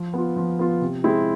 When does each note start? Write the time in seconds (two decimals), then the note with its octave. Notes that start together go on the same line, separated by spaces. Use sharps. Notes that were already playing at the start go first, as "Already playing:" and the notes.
Already playing: F3
0.13 B3 F4
0.36 F3
0.59 B3 F4
0.81 C3
1.04 G#3 C4 E4